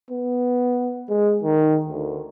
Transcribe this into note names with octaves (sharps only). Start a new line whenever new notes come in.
B3
G#3
D#3
D2